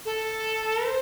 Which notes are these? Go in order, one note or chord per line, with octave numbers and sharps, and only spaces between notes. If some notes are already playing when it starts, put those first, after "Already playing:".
A4
C5